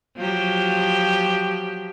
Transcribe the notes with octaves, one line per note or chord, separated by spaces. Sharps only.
F3 F#3 G4